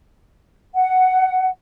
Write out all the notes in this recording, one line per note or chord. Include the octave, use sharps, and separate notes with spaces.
F#5